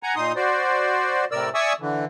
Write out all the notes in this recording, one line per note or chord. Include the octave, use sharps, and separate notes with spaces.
F#5 G#5 A#5
A#2 D#4 C6 D#6
F#4 C5 D5
A2 C3 A#4 D5 E6
D5 E5 G#5 C#6 D#6 E6
D3 E3